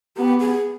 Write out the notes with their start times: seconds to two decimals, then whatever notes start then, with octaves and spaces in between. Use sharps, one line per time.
0.17 B3 G4
0.40 G#4